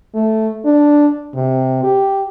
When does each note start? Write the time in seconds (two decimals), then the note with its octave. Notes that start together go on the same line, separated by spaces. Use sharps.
0.14 A3
0.65 D4
1.35 C3
1.83 G4